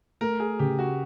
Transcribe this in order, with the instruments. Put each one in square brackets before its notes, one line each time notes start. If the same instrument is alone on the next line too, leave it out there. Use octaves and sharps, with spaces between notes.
[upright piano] A3 [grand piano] A#4
[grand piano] G#4
[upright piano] C#3 [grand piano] G4
[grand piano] F#4